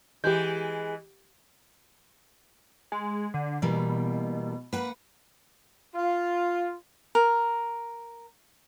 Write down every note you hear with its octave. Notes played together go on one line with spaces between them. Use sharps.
E3 G#3 G4 G6
G#3
D3
B2 E3 G3 A#3
A#3 B4 F#5
F4
A#4